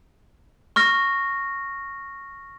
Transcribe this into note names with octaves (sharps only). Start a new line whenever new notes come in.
C#6 F6 A#6